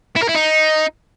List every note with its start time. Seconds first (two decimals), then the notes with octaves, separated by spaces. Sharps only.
0.16 E4
0.22 A#4
0.29 E4
0.35 D#4